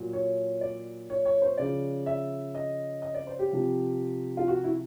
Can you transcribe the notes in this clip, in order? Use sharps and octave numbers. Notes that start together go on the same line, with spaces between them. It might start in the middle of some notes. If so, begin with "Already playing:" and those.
Already playing: A#2 F#3
C#5
D5
C#5
C#5
C5
C#3 F3 D5
E5
D#5
D#5
D5
C5
G4
C3 F3
F4
F#4
E4